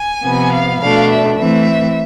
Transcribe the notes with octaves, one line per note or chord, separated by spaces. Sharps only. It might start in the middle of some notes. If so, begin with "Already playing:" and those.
Already playing: G#5
C3 F3 B3
F5
B2 A3 D4 F5
E5
E3 A3 C4 E5